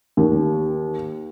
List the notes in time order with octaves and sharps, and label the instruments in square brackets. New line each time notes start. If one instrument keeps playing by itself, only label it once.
[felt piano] D#2